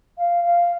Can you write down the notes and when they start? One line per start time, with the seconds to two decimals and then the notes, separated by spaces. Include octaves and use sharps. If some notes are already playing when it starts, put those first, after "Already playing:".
0.18 F5
0.44 F5